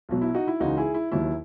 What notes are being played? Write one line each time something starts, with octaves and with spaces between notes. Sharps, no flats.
B1 B2 F#3
E4
D#4 F#4
E4
C#2 C#3 E3 D#4 F#4
E4 G#4
E4
D#2 D#3 F#3 E4